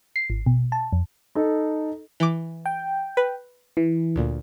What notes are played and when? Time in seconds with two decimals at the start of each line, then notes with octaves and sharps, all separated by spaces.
0.16 C7
0.30 G#1
0.46 B2
0.72 A5
0.92 F2
1.35 D#4 A4
2.20 E3 D6
2.66 G5
3.17 B4
3.77 E3
4.16 D2 A#2